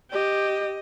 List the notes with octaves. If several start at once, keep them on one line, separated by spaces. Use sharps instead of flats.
G4 D#5